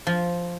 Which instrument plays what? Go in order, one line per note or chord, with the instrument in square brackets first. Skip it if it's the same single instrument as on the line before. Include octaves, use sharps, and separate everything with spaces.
[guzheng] F3